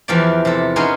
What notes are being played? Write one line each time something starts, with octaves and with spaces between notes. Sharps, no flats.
E2 E3 F3 G4 D5
C3 A4
B3 C#4 D#4 G#4 A#4 C5